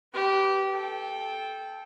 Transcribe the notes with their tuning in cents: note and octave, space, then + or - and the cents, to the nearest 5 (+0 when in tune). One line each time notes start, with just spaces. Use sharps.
G4 -20 B4 +0
A4 -20 G5 +0